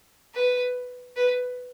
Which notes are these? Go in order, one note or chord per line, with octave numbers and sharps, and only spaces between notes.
B4
B4